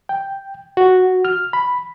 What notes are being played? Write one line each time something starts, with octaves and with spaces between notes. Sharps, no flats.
G5
F#4
F6
B5